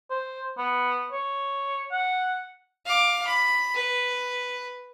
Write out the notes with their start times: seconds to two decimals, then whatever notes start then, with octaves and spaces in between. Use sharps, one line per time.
0.10 C5
0.58 B3
1.12 C#5
1.92 F#5
2.86 F5 D6
3.27 B5
3.75 B4